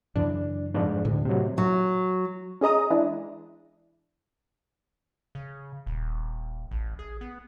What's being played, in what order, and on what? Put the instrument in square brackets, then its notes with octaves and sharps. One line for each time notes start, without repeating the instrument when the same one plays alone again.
[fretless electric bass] F#2 C#3 E3 [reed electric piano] D4
[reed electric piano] F2 G#2 D4
[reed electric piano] D2 [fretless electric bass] A2
[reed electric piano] C3 F#3
[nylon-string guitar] F#3
[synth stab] C#4 G#4 D#5 A#5 D#6
E3 G#3 D4 E4
[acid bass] C#3
D#1
A1
G#4
B3